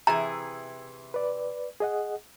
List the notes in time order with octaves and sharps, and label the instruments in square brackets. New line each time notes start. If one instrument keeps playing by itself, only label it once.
[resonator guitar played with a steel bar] C3 E3 G#4 [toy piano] A#5
[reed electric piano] B4 D5
G#4 D#5 F#5